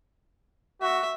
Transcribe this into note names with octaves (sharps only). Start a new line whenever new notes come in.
F#4 E5